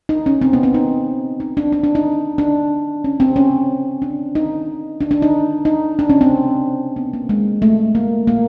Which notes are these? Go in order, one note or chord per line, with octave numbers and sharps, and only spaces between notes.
D#4
C#4
C4
B3
C4
D#4
D#4
D4
D4
D4
D#4
D4
C#4
C4
C#4
D4
D#4
D4
D4
D#4
D#4
D4
C#4
C4
B3
A#3
G#3
A3
A#3
A#3